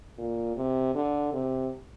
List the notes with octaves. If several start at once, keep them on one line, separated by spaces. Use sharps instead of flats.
A#2
C3
D3
C3